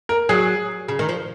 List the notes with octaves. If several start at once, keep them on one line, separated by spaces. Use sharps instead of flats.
A#4
F#3 G#4
C#3
D#3
F3